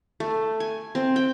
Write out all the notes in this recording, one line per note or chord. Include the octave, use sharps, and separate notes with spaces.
A3
G#5
C4
G5